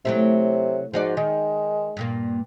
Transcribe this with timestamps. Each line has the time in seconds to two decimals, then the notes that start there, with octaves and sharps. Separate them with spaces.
0.05 C3 F#3 A3 E4
0.94 G#2 F3 F#4 D5
1.17 D#3 G#3
1.97 G2 A#2 A#3